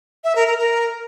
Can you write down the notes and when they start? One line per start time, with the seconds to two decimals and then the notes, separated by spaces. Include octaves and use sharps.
0.24 E5
0.35 A#4
0.47 A#4
0.58 A#4